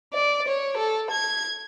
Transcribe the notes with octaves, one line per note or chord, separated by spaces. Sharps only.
D5
C#5
A4
G#6